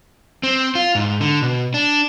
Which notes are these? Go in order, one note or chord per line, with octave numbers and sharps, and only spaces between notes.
C4
F4
G#2
D3
B2
D4